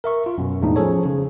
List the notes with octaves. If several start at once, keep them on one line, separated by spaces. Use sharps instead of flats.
A#4 E5 C#6
F4
F#2 B2
E2 A2 G#3 D4 D#4
F3 C#4 G#4 A4 C#5
C#3